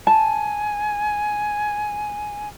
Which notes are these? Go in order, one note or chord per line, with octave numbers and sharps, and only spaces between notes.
G#5 A5